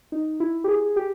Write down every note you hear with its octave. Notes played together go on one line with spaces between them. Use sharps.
D#4
E4
G4
G#4
G4